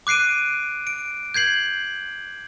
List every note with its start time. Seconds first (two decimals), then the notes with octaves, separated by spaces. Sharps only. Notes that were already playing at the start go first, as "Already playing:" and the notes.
0.07 D6 F#6 C7 D7 D#7
0.87 D7
1.34 G6 G#6 C7 F#7